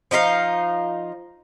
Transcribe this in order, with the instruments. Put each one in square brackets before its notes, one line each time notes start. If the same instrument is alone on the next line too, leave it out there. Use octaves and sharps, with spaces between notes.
[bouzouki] F3 D#4 E4 F5